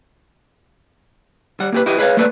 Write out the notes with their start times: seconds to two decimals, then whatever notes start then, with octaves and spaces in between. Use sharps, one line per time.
1.60 G3 F#5
1.72 A#3 G4 B4
1.86 E4 F#4 G4 B4 D#5
1.98 G#4 B4 C#5 F5
2.17 A3 A#3 A4 B4 D5